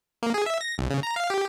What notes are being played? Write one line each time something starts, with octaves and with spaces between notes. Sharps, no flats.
A#3
G#4
E5
A#6
C2
C#3
A#5
F5
G4